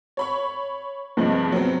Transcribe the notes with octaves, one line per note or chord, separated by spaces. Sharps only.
C#5 B5 C#6
G2 C3 F3 G#3
F#3 B3 C4